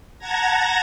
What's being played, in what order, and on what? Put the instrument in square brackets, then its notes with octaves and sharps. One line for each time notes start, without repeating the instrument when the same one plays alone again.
[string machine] F#5 A5 A#5 G#6 A#6